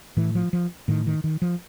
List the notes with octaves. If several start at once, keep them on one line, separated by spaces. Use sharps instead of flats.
A2 E3
F3
F3
A2 D#3
D#3
D#3
F3